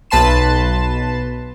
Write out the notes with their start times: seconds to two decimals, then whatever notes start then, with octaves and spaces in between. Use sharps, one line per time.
0.11 B1 B4 A5 C6 E7